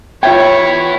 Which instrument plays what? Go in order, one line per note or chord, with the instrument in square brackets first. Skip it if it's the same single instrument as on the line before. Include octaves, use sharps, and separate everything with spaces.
[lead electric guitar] B3 E4 [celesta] F4 E5 G#6 [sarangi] C#5 [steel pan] G5